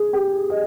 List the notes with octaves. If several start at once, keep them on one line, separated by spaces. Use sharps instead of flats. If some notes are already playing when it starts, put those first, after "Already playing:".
Already playing: G#4
G4
D#5